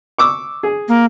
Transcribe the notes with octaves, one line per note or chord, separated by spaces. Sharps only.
C#6 D6 E6
G#4
A#3